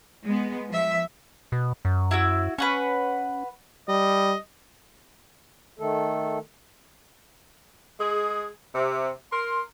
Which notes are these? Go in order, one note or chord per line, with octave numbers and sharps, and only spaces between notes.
G#3 B3
F3 E5
B2
F#2
E4 F#4 E6
C#4 B4 F#5 C#6
G3 D#5
D#3 A3 A4
G#3 G#4
C3
A#4 C6